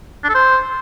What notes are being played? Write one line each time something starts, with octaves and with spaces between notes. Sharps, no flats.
D4
A4
C5